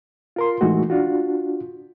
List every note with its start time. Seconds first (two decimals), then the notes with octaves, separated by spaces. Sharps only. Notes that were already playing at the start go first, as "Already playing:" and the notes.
0.36 F4 A#4 C6
0.61 A2 E3 G#3 A3 D#4 F#4
0.90 D4 F4 F#4